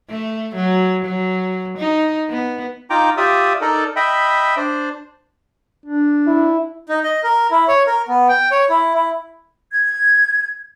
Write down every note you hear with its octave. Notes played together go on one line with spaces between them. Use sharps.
A3
F#3
F#3
D#4
B3
D#4 F4 G5 A#5 D6
F4 G4 D5 E5 D#6
D#4 A4 A#4 D5
D#5 E5 G5 B5
D4 C5 D5
D4
E4
D#4
D#5
A#4
E4
C#5
A#4
B3
G5
C#5
E4
E4
G#6